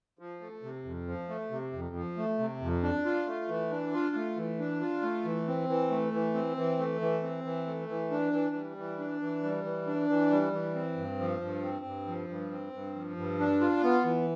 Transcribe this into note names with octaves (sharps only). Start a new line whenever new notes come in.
F3
A3
C3
F2
F3
A3
C3
F2
F3
A3
C3
F2
D4
F4
A3
E3
D4
F4
A3
E3
D4
F4
A3
E3
C4
E3
A3
E3
C4
E3
A3
E3
C4
E3
A3
E3
D4
E3
G3
E3
D4
E3
G3
E3
D4
E3
G3
E3
C4
G2
F3
G2
C4
G2
F3
G2
C4
G2
F3
G2
D4
F4
B3
E3